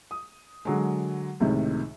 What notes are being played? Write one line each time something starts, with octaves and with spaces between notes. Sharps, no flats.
D#6
D3 F#3 G#3
C#2 A2 C3 D#3